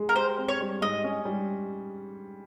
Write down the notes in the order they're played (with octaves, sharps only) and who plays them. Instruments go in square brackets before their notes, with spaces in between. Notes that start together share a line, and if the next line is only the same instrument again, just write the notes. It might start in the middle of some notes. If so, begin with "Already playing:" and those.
Already playing: [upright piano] G#3
[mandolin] A#4
[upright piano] G4 [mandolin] C5
[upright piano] C4
[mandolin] C#5
[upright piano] G3
[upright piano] G#2 [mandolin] D#5
[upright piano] C#4
G3